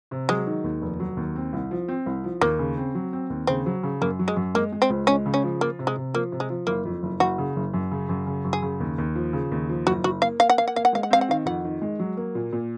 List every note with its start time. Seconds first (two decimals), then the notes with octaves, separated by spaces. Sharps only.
0.11 C3
0.29 F#3 G#3
0.47 D#3
0.64 D#2
0.82 F1
1.00 F#3
1.17 D#2
1.36 C4
1.53 C2
1.71 F3
1.88 C4
2.06 C2
2.24 F3
2.42 D#2 A#3
2.59 C#3
2.77 C4
2.95 F#3
3.13 C4
3.30 D#2
3.47 C#3 C4
3.66 F#3
3.83 C#3
4.01 F#2 A#3
4.19 F#3
4.28 G#3
4.36 F#2
4.54 G#3 A#3
4.72 G#3
4.82 C4
4.90 C#2
5.07 G#3 C#4
5.26 C#3
5.34 C#4
5.43 F3
5.61 A#3 F4
5.79 C3
5.87 G#3
5.96 C3
6.14 F3 A#3
6.32 C3
6.40 G#3
6.50 F3
6.67 F#1 A#3
6.85 F2
7.03 F#1
7.20 F#1 F#4
7.38 C#3
7.56 F#1
7.73 F#2
7.91 C#3
8.09 F#2
8.27 C#3
8.44 F#2
8.53 G#4
8.62 C#3
8.80 D#2
8.98 D#2
9.15 F3
9.33 C#3
9.51 D#2
9.69 F3
9.86 F#1 F#4
10.04 F#1 F#4
10.22 A#3 F5
10.40 A#3 F5
10.50 F#5
10.58 A#3 F5
10.68 F#5
10.76 A#3 F5
10.85 F#5
10.93 G#3 F5
11.03 F#5
11.11 C4 F5
11.21 F#5
11.29 D#3 F5
11.46 F2 F#5
11.64 D#3
11.82 G#3
11.99 F#3
12.17 A#3
12.35 A#2
12.52 A#2